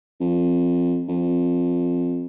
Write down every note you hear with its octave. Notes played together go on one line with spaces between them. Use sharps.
F2
F2